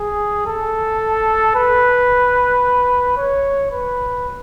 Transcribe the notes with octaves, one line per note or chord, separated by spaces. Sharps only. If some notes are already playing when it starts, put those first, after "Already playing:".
Already playing: G#4
A4
B4
C#5
B4